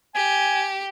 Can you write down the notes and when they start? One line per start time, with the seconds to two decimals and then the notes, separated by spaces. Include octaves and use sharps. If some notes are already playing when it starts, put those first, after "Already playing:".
0.15 G4 G#5